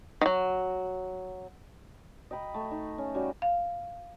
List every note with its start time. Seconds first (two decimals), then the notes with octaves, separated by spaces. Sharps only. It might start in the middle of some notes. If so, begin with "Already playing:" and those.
0.21 D#3 F#3
2.31 D#5 G5 A#5 B5
2.54 A3
2.71 D#4
2.98 C#4
3.15 G3 C#4 F#4
3.42 F5